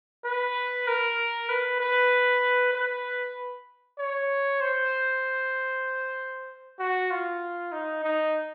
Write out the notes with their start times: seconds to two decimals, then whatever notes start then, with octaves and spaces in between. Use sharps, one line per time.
0.24 B4
0.87 A#4
1.49 B4
1.80 B4
2.74 B4
3.99 C#5
4.61 C5
6.79 F#4
7.11 F4
7.72 D#4
8.04 D#4